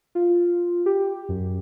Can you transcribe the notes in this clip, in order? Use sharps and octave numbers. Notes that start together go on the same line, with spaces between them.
F4
G4
F#2